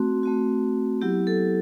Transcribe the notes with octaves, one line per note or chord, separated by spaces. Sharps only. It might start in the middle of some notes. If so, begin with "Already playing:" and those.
Already playing: A3 C4 F#4
A3 C4 F#4
F#3 B3 E4 G4
A4